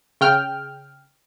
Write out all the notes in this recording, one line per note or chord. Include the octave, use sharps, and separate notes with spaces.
C#3 G5 F6